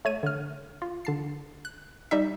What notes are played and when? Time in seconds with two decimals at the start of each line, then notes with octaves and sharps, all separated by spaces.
0.05 A3 C#5 D#7
0.23 D3 F6
0.82 F4
1.05 D3 A5 C7
1.65 F#6
2.11 G3 D#4 E5